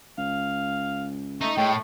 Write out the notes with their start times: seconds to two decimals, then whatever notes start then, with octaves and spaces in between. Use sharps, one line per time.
0.18 C#2 F5
1.41 A3 D#4
1.58 A2 G#3 A3 G5